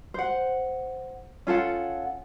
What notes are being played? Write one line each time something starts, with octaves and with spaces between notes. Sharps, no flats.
C5 F#5
C#4 F4 A4 F#5